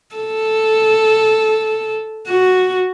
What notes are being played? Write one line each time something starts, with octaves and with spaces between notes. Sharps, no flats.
A4
F#4